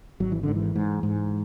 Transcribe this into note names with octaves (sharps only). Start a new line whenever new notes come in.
G#1 F#3
E3
G#2 D3
E3
G#2
G#2